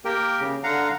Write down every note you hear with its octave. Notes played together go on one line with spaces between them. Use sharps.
A#3 G4 A#4 G5
C#3
D3 F5 F#5 A#5